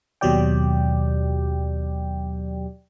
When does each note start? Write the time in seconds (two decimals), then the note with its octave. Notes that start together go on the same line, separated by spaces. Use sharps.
0.21 D#2 B2 F#3 G4 D5 G5